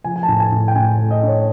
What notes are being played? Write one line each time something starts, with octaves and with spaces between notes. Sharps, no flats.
F3 G#5
G#5
A5
A2
G#5
A2
G5
A2 G#5
A3
D#5
D4
C#5